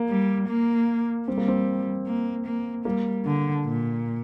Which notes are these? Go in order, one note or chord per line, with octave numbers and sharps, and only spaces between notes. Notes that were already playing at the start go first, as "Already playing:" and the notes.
Already playing: A#3
G3
A#3
G3 C4
A#3
C4
A#3
A#3
G3 A#3
D3
A#2